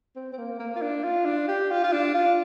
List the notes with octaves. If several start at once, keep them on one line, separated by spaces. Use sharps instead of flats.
C4
C4
A#3
A#3
F4
D4
F4
D4
G4
F4
F4
D4
F4